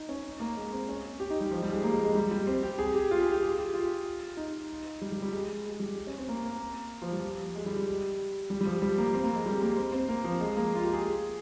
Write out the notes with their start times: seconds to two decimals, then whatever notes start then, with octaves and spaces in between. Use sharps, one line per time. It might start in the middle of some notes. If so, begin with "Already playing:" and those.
Already playing: D#4
0.09 C#4
0.40 A#3
0.57 G#3
0.72 C4
0.89 C#4
1.20 G4
1.30 D#4
1.41 G3
1.51 F3
1.63 G3
1.73 G#3
1.83 A#3
1.93 G#3
2.04 G#3
2.15 G3
2.31 G3
2.47 C4
2.63 G4
2.79 G#4
2.94 G4
3.11 F4
3.21 G#4
3.32 G4
3.42 G#4
3.58 G4
3.74 F4
4.37 D#4
5.01 G3
5.12 G3
5.22 G3
5.33 G#3
5.65 G#3
5.80 G3
6.07 C#4
6.17 C4
6.28 A#3
6.43 A#3
7.02 F3
7.12 G3
7.55 G#3
7.66 G3
7.76 G3
8.50 G3
8.61 G3
8.65 F3
8.82 G3
8.98 A#3
9.14 C4
9.24 A#3
9.35 G#3
9.46 G3
9.62 A#3
9.77 C4
9.92 C4
10.09 A#3
10.24 F3
10.41 G#3
10.57 A#3
10.75 F4
10.84 G4
10.93 G#4